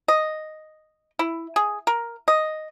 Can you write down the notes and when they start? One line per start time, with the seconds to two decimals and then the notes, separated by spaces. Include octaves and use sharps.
0.08 D#5
1.19 E4
1.56 G#4
1.87 A#4
2.28 D#5